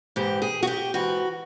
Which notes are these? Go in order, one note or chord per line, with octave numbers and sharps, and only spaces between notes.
G#2 E3 G4
G#4
F#4
G4
G#2 E3 F#4